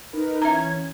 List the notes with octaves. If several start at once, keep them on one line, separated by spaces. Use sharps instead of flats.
D#4 A#4 B4
E3 C#4 E5 A#5 G#6